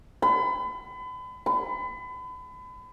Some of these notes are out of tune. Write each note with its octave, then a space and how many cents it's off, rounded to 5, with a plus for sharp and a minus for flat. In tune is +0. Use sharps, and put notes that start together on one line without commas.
B5 +35
B5 +35